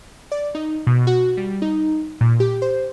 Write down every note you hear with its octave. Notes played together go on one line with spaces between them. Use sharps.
D5
D#4
B2
F#4
G3
D#4
A#2
G4
C5